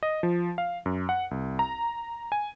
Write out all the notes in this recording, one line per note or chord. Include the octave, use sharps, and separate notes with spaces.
D#5
F3
F5
F#2
F#5
C2
A#5
G#5